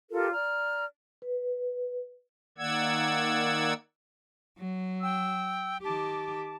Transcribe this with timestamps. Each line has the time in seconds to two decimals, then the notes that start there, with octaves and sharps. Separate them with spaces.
0.11 F4 G4 A4 A#4
0.32 D5 A#5 F6
1.22 B4
2.58 D#3 A#3 D5 F#5 E6 G#6
4.58 F#3
5.01 G5 E6
5.82 D#3 G4 A5 D6